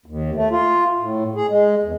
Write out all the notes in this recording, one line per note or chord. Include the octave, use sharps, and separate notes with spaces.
D#2
A3
F4
A2
G#4
G#3
E2